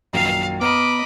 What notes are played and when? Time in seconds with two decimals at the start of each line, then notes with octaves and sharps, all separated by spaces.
0.13 A#1 F#2 D#3 F5
0.61 B3 D#5 A#5 B5 D6 F6